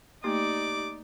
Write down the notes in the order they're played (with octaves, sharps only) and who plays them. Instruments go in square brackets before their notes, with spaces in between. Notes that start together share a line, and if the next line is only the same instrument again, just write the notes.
[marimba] A3 A#3 [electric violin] D#4 D5 [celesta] G4 [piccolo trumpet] D6